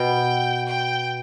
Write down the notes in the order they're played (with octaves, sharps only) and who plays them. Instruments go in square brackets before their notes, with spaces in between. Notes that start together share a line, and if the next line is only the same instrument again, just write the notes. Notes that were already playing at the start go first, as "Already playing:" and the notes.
Already playing: [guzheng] B2 [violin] G5
[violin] G5